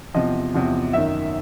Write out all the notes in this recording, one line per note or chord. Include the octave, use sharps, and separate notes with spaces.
E2 C3 F3 D#5
E2 C3 F3
F#2 D#3 E5